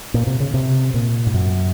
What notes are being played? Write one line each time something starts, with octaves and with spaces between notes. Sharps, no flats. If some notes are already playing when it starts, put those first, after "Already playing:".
A#2
C3
C#3
C3
A#2
G#2
F#2